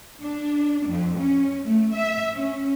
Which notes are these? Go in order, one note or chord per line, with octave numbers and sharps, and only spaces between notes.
D4
F2
C#4
A3
E5
C#4